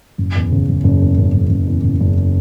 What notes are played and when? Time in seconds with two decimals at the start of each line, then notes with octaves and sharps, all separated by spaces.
0.18 F#1
0.36 E2
0.52 C#3
0.69 F#1
0.84 F#1
1.02 E2
1.18 C#3
1.34 F#1
1.50 F#1
1.67 E2
1.84 C#3
2.00 F#1